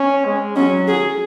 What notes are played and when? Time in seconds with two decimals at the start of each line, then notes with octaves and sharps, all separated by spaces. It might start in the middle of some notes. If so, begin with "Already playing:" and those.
Already playing: C#4
0.25 G#3
0.56 F#3 C#4
0.88 G#4